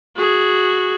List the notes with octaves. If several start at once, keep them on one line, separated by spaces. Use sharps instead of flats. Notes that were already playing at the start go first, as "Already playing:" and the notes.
F#4 G#4